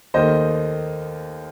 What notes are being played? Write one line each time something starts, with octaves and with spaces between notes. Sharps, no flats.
D#2 D#3 A3 C5 D#5